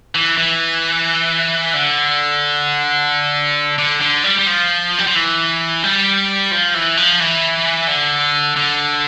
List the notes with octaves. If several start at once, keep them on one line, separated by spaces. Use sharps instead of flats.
E3
E3
D3
D3
D3
G3
G3
F3
G3
F3
E3
G3
F3
E3
F3
E3
D3
D3